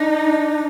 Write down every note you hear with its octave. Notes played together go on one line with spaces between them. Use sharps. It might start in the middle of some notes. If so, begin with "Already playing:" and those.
Already playing: D4 D#4